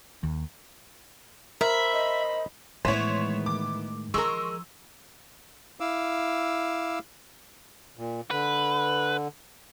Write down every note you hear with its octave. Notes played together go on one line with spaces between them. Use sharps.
D#2
A#4 C5 E5 B5
D#5
A2 D#3 E3 G#3 B3 E4 C5 C#5
D6
F3 G#3 A#4 C6 C#6 E6
E4 F5 D6 E6
A#2
D3 B4